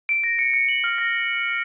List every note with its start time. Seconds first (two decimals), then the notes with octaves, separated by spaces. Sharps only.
0.09 D7
0.24 A#6
0.39 C#7
0.54 C#7
0.69 F#7
0.84 F6
0.98 A#6